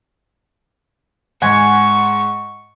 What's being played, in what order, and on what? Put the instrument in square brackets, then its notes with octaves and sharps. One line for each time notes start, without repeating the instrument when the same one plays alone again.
[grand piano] G#2 [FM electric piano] F#5 [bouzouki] G#5 [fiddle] C#6